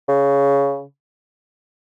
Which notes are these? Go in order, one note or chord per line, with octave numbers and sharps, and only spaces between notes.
C#3